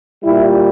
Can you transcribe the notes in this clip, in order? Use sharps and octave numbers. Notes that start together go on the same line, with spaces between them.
A#2 G3 E4